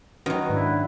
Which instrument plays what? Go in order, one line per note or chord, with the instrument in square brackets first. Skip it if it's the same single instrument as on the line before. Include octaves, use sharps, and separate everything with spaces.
[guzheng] D#3 F#3 [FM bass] C#4 [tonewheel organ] F#4 B4
[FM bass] G#2 [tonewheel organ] D4 F#5 [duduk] E4